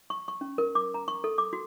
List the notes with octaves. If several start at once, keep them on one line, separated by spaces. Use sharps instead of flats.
C#6
C#6
C#4
A#4
D6
A#5
C#6
A4
D6
F#4